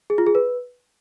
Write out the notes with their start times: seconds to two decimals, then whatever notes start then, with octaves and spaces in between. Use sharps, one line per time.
0.10 G#4
0.18 F4
0.26 G#4
0.35 B4